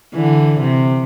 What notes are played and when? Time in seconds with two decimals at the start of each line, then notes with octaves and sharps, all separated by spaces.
0.15 D3 E3
0.60 C3